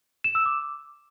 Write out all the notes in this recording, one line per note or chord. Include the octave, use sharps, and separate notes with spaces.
E7
E6
D6